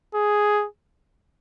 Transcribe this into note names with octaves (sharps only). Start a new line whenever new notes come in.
G#4